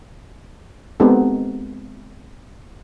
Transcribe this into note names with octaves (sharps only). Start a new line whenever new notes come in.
G#3 B3 C4 D#4 G4 A4